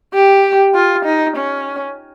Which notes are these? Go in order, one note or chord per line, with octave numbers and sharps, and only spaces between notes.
G4
F4
D#4
C#4